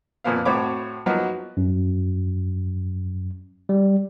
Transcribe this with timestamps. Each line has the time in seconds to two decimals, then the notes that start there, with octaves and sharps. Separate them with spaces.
0.24 F2 A#2 F3 A#3 B3 F5
0.45 A2 C4 F#4 C#5 B5 D6
1.06 F3 F#3 A#3 B3 D#4 F#4
1.57 F#2
3.69 G3